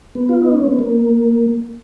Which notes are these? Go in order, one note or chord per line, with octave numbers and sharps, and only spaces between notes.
B3
F4
D#4
C#4
B3
A#3